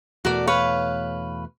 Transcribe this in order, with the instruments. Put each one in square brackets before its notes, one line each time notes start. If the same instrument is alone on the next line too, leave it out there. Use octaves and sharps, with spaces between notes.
[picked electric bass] E2 B2 A3 [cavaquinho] F#4 A#4 D5
[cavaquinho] B4 C#5 F5